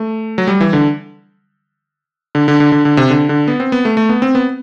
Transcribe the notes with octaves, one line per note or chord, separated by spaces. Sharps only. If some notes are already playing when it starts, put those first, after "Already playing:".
Already playing: A3
F#3
G3
E3
D3
D3
D3
D3
D3
D3
C3
D3
D3
B3
C4
B3
A3
A3
B3
C4
B3